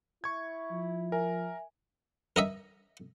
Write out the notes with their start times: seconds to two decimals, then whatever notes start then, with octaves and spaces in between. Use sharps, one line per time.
0.24 E4 C#6 G#6
0.71 F3
1.12 A#4 E5 G#5
2.36 A#4 D#5 E5